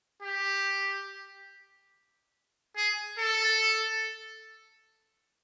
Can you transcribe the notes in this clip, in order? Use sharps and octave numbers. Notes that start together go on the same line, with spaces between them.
G4
G#4
A4